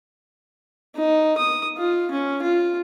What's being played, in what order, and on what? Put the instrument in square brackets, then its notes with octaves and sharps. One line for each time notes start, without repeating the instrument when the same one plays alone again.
[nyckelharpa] D#4
D#6
F4
C#4
F4